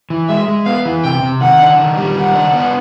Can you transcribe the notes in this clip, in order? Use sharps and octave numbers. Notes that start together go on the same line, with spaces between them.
E3
G#3 E5
G#3
B3 F5
E3
C3 G5
C3
D#3 F#5
D4
D#3
G3
D#3 F#5
D4
B3